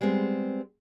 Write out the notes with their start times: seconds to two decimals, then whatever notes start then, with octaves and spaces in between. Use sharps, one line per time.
0.01 G3 G#3 B3 C4